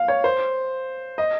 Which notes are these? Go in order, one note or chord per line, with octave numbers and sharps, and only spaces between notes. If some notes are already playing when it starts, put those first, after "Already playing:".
Already playing: F5
C#5
C5
D#5